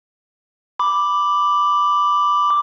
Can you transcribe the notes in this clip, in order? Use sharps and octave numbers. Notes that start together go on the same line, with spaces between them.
B5 D6